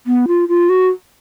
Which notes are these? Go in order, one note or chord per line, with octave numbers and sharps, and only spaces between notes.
B3
F4
F4
F#4